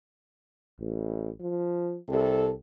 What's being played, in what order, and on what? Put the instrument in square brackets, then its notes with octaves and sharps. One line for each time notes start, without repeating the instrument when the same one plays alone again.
[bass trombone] A1
F3
[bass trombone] C2 [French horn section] C3 G4 A4